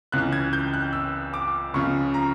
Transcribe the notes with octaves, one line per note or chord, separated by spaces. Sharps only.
C#2 C#3 E3 F#6
G#6
G6
F#6
E6
D6
C#2 C#3 F3 C#6
A#5